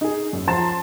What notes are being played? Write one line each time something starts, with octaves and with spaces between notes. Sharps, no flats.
D#4 G#4
F#2
F3 A5 A#5 C6 A6 E7